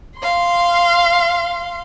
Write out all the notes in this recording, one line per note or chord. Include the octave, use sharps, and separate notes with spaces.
F5 C6